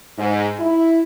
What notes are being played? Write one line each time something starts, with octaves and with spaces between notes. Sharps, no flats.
G#2
E4